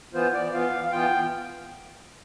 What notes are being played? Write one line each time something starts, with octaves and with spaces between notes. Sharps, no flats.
E3 B3 F4 C5
D5
E3 B3 F4 F5
F5
E3 B3 F4 G5